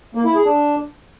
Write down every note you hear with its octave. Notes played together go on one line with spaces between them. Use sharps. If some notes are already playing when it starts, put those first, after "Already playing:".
A#3
E4
G#4
D4